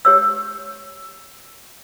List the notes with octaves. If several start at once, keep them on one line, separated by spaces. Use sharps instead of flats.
G4 C#5 E6